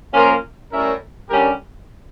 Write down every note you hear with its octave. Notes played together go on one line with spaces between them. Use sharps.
F3 A#3 C#4 F4 A#4
A2 G3 C#4 E4 A#4
D3 G3 C#4 G4 A#4